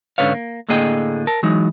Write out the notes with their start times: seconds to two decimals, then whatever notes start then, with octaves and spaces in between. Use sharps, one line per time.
0.18 G#2 D3 C#4 B4 C#5 F5
0.34 A#3
0.69 A2 D3 A#3 G#4 D#5 G5
1.27 A#4 A5
1.43 E3 F#3 G#3 D#4